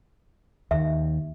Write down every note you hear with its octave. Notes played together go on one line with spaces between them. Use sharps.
D#2 D#3 E5